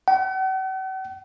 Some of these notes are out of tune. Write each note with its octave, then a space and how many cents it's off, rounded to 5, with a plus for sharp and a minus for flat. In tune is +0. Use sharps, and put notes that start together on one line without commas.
F#5 +45